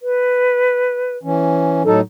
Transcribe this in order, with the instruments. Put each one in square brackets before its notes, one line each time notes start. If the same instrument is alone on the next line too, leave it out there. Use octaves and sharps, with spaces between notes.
[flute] B4
[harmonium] E3 C#4
[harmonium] A2 F#3 D#4 [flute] A4